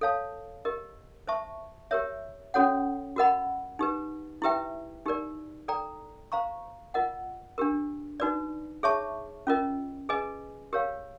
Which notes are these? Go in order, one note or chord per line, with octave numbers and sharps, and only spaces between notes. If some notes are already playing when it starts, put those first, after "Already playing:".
A4 C#5 F5 A5
G4 A#4 D#5
C5 E5 A5 C#6
G4 A#4 C#5 E5
C#4 F#4 A4 C#5 F#5
F#4 A#4 D#5 F#5 B5
D#4 G4 B4
E4 G4 B4 E5 G5
D#4 G4 A#4 D5
A4 D5 G5 A#5
C5 F5 A#5 C#6
F4 A#4 D#5 F#5
D4 G4 A#4
D#4 F#4 B4 D5
G#4 C#5 E5 A5 C#6
C#4 F4 A#4 D#5
G#4 B4 D#5 G#5
G4 A#4 C#5 F5